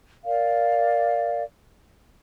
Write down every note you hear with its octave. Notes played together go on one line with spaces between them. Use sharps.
A#4 D5 F5